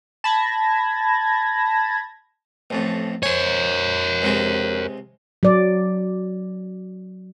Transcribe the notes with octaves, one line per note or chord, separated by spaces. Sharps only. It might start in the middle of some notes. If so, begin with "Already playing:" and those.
A5 B5 G#6 A#6
A1 F2 A2
A#4 C5 C#5 G#5
C#2 C3 G#3
F#3 D5